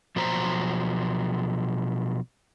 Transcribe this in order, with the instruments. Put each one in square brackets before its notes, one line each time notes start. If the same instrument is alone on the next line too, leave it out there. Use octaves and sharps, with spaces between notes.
[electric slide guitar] B2 F3 F#3 C5 A#5